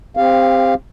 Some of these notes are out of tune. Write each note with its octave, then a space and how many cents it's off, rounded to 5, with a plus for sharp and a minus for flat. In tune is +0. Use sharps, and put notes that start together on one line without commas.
C4 +0 G4 +30 F5 -5